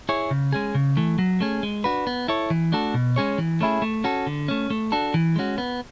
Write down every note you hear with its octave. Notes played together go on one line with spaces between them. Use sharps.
E4 G#4 C#5
C#3
G#3 C#4 G#4
C#3
E3 A3
F#3
A3 C#4 G#4
G#3
D4 F#4 B4
B3
E4 A4 C#5
E3
A3 D4 F#4 A4
B2
G#3 C#4 G#4 C#5
E3
A3 C#4 E4 G#4
A3
C#4 F#4 A4
D3
A3 C#4
A3
D4 F#4 A4
E3
G#3 C#4 F#4
B3